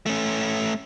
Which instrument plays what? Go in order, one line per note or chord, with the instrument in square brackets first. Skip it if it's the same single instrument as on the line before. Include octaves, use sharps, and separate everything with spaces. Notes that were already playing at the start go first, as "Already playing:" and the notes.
[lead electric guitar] A3 C#4